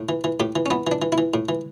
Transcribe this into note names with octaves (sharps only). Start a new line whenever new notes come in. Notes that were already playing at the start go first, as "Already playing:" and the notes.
Already playing: A2
E3
E3
A2 G4
E3
C#4
E3 B3
E3 D4
E3
E4
E3
A2
E3